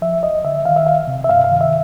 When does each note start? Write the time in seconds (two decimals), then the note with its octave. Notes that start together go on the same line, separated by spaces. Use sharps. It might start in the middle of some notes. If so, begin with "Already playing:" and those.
0.02 F3 E5
0.23 D2 D#5
0.44 D3 E5
0.65 D#3 F5
0.76 E5
0.86 C#2 F5
1.07 C3
1.24 E5
1.29 G2 F5
1.44 F5
1.51 D#3
1.61 E5